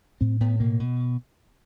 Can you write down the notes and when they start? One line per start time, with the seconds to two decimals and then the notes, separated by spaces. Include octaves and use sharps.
0.21 A2 C4
0.40 A2 B3
0.60 B2 A#3
0.80 B2